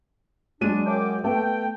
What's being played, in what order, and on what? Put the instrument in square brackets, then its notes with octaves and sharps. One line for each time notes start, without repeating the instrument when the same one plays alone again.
[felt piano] F#3 G#3 D#7 [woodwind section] D4
[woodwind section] F#2 G5 D6
[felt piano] A3 B3 [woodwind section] G5